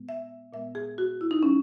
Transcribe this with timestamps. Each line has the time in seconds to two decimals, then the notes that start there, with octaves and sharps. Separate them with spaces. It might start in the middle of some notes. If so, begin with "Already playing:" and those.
Already playing: A#2 G#3 B3
0.09 E5
0.53 A#2 G#3 B3 E5
0.75 G#4
0.98 F#4
1.21 E4
1.31 D#4
1.43 F#3 C#4